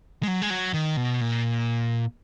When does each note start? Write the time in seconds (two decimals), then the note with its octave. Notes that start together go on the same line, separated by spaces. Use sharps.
0.23 G#3
0.28 F#3
0.42 G#3
0.50 F#3
0.74 D#3
0.97 B2
1.21 A#2